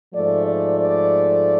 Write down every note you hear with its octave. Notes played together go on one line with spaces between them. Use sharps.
G#2 F3 A3 D5
D5
D5